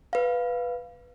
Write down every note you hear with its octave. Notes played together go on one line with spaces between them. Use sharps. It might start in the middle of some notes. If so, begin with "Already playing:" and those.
B4 F5